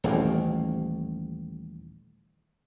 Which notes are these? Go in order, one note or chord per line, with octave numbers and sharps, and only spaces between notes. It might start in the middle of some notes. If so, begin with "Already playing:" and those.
D#1 A1 D#2 A#3